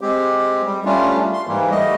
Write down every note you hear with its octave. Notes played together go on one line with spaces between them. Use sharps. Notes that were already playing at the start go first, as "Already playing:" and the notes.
G#3 C4 G4
G3
G3 A3 C#4 D4 F4
C6
G#2 E3 G3 A#3
G3 A3 D#5